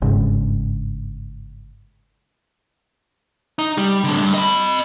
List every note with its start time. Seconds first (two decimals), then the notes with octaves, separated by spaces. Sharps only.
0.02 G1 G#2 C#3
3.59 D#4
3.78 G3
4.04 A2 D3
4.18 G2
4.34 D#5 B5